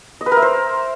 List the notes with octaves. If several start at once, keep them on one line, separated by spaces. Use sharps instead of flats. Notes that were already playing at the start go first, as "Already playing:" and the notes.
D#5
B4
A#4
E5
C5